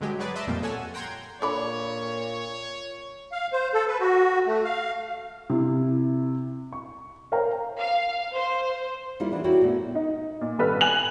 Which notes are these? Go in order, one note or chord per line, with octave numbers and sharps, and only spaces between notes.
G2 D3 F#3 G#3 G4
F#3 F#4 G#4 B4 D5
D#5 E5 A5 C6 D6 E6
F2 A#2 F3 G3 A#3
A4 C#5 F#5 G#5 E6
F#5 G5 A#5 C6 G6 G#6
A#2 D3 C#5 D5 B5
F5
C5
A4
B4
F#4
A3
F5
C3 E4
C#6
A#4 C5 C#5 F5 G5 A#5
F5
C5
G3 A#3 E4 F4
E3 B3 D4
E4 F#4 G4 A#4 C#5 D5
A#2 A3 B3
D#4
A#2
G#1 G3 A4 B4 F6
G#5 F#6 F#7